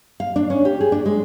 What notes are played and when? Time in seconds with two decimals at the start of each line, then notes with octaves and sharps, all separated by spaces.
0.20 F5
0.36 D4
0.50 C#4
0.65 G4
0.81 G#4
0.92 D4
1.06 G#3